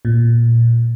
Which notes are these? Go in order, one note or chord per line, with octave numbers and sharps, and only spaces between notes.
A#2